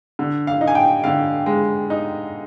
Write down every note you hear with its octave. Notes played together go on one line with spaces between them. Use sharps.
D3
F5
D#4
G#5
G5
D3 F5
G#3
D#4